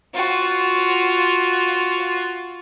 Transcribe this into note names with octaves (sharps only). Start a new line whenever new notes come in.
F4 F#4